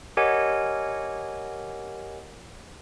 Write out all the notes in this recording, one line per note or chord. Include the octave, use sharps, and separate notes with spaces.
G4 A#4 C#5 D#5 F#5 G#5